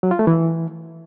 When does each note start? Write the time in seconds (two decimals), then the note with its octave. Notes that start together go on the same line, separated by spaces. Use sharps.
0.03 F#3
0.11 F4
0.19 A3
0.27 E3